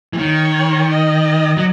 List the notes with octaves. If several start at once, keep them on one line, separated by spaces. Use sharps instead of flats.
E3
D#3 C#5
D#5
F#3